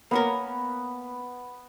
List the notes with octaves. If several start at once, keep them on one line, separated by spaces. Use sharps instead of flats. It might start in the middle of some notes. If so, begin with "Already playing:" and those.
A#3 B3 C#4 A#4